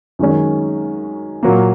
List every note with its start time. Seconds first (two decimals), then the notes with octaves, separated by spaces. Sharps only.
0.19 F#2 D#3 G#3 C#4
1.43 A#2 F#3 A#3